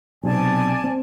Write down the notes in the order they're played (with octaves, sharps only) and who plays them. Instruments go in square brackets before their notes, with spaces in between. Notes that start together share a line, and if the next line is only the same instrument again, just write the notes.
[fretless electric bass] B1 C3 [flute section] D5 G#5 A5
[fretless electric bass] C4